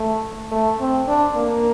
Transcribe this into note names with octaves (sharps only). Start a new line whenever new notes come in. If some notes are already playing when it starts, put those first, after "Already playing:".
Already playing: A3
A3
C4
D4
A#3